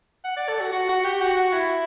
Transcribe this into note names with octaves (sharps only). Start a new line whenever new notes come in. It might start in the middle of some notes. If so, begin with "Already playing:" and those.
F#5
D5
A4
F#4
F#4
F#4
G4
F#4
F#4
E4